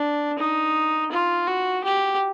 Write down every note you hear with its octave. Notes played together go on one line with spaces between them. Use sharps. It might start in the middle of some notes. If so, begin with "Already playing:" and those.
Already playing: D4
D#4
F4
F#4
G4